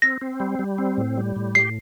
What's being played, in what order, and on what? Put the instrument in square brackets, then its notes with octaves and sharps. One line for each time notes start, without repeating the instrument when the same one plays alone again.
[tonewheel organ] C4 [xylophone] A#6
[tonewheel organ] C4
G3
G3
C4
A2
G3
A2
[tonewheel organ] G4 [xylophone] C7